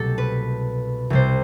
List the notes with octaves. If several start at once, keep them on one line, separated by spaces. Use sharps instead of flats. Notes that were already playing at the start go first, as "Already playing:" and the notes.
Already playing: C2 B2 F#3 A3 G4 A4
B4
C2 C3 G3 C5